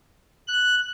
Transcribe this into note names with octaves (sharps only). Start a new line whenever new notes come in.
F#6